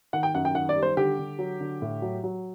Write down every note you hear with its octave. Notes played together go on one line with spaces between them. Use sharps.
D#3 F#5
G5
F#2 F#5
G5
D#3 F#5
D5
G3
C5
D3 G4
D3
F#3
D3
A2
F#3
F#3